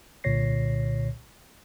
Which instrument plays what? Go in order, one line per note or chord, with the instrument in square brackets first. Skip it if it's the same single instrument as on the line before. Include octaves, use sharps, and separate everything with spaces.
[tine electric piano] C2 A#2 D3 C#5 A#6 C7